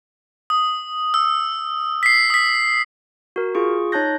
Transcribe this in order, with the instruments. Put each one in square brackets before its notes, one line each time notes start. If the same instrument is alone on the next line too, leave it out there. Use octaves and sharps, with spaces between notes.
[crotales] D#6
E6
B6 C7
D#6 B6
[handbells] F#4 A#4
F4 G#4 C#6
D#4 C#5 A5 F#6 G6 A#6